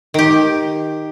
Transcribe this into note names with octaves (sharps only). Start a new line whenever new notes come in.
D#3 G4